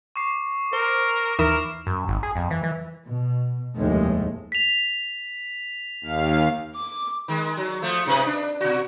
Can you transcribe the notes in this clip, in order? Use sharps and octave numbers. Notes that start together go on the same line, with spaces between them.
C#6 D6 C7
A#4 C5
D#2 E3 A#4 E7
F#2
G#1
G#4
F2
E3
E3
B2
F1 D#2 A2 G#3 A3
B6 F7
D#2 F5
D6
D#3 G#3
F#3
F3 A3
G#2 C3 B4
D4
B2 F#4